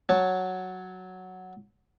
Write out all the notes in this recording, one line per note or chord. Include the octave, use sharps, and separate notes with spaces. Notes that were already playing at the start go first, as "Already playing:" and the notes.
F#3 C#5 A5